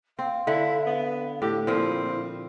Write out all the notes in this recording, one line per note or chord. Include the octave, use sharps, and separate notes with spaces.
C4 F5
D3 E4
B3
A2 G4
A#2 F3 C4 E4